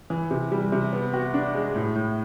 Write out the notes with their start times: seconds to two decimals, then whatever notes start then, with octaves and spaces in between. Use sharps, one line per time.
0.10 E3
0.31 C3
0.52 G3
0.72 C3
0.93 B3
1.13 F#4
1.34 D4
1.54 G#3
1.75 A2
1.95 A2